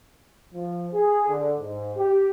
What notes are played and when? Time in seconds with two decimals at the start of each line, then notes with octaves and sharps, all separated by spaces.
0.54 F3
0.93 G#4
1.29 D3
1.59 G#2
1.97 G4